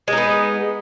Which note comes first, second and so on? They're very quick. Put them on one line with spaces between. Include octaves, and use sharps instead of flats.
G#3 D#4 B3